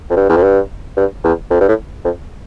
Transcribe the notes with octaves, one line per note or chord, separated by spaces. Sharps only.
F2
G2
E2
F2
G2
G2
E2
F2
G2
A2
F2